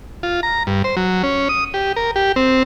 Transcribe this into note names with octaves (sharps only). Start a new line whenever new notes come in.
F4
A#5
G2
C5
F#3
C#4
D#6
G4
A#4
G4
C4